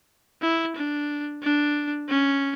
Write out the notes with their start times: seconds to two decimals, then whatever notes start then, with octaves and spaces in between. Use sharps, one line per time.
0.42 E4
0.76 D4
1.43 D4
2.09 C#4